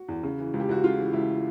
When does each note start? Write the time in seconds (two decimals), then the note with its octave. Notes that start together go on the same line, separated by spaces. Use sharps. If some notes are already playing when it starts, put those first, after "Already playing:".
Already playing: F#4
0.08 E2
0.23 C#3
0.39 E3
0.54 C#2
0.60 G4
0.69 C#2 F#4
0.84 C#3 F4
0.99 E3
1.13 C#2 E4